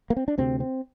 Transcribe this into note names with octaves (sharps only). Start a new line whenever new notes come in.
A#3
C4
D4
D2 C3 C4
C4